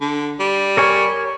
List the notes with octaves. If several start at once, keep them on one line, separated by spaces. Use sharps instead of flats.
D3
G3
A#4 C#5 G#5